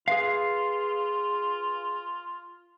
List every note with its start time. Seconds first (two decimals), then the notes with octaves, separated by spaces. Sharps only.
0.08 F4 G#4 B4 F5